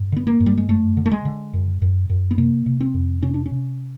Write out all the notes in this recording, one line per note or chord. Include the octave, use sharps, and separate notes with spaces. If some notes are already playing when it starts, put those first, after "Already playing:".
Already playing: G2
D3 B3
A#3
G2
G3
G#3
F#2 A3
D3
A3
G#3
D3
F#2
F#2
F#2
B3
C3 A#3
C3
C4
F2
C3 C#4
D4
C#4
C3